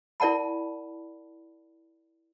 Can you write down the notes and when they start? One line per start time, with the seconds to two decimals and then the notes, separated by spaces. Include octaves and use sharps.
0.20 E4 A#4 D5 F#5 A5 B5